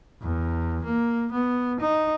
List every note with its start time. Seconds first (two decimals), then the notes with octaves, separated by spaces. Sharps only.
0.21 E2
0.84 A#3
1.32 B3
1.80 D#4